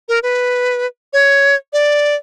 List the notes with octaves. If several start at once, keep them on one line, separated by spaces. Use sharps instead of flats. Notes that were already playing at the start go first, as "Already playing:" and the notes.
A#4
B4
C#5
D5